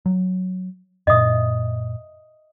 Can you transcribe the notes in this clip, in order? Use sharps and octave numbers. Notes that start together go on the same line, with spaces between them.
F#3
F#2 A#2 D#5 E5 D#6